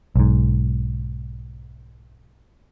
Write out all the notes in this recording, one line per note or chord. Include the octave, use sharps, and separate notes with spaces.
B1 G#2